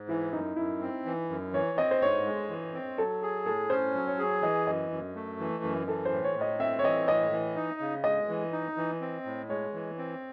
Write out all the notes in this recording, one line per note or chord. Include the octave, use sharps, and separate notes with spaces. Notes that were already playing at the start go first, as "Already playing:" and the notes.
Already playing: G#2
E3 E4
F#2 D#4
F#2 E4
C4
E3
F#2
E3 C#5
C4 D#5
C5
G#2 C#5
G#3
E3
C4
F#3 A4
G#4
A2 A4
C#4 C5
F#3
C#5
G#4
E3 D#5
F#2 D#5
F#2
A3
E3
F#2
E3 A4
C5
A2
C#5
A2
D#5
C4 E5
C#5
E3 D#5
A2 D#5
E3
D#4
C#3
G#3 D#5
E3
D#4
E3
C4
A2
G#3 C#5
E3
C4